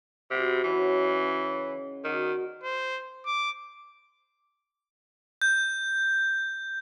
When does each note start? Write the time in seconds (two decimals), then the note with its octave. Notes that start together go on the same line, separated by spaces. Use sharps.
0.31 C3 B3 F#4
0.64 E3 F#3 C#4 D#4
1.23 C#3 G5
2.05 D#3 F#4 G#4 D5
2.64 C5
3.26 D6
5.42 G6